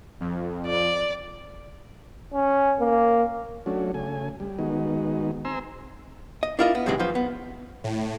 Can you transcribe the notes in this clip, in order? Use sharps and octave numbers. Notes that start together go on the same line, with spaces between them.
F2
D5
C#4
A#3
F#3 A3 C#4 D4 F#4
C#3 A3 G#5
G3
D#3 G#3 B3 D#4 F#4
C4 G#5 A#5 C6 E6
D#5
D4 E4 F4 A#4 C#5 D#5
B3
A2 C3 D#3 E3 F#3 G#3
F#2 F3 B4 C5
B3
A2